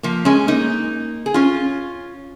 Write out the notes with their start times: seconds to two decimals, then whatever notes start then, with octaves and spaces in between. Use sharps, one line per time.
0.03 F3 A#3
0.25 G#3 C#4
0.48 A#3 D#4
1.26 G#4
1.34 C#4 F4